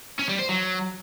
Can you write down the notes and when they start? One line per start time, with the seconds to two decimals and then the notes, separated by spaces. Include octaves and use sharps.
0.19 C#4
0.29 G3
0.39 C5
0.49 F#3